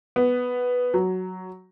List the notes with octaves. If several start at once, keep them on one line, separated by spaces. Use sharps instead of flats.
B3
F#3